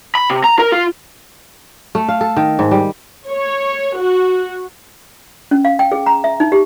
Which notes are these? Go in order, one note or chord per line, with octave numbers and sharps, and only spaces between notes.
B5
C3
A#5
A#4
F4
A3
F5
A4
D#3
G#2
G3
C#5
F#4
C#4
F5
G5
G#4
A#5
E5
D#4
G4